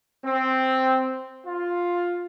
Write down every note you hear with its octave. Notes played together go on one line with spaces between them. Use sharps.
C4
F4